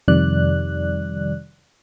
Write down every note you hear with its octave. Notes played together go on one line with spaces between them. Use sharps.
F2 C3 D#3 G3 D5 F#6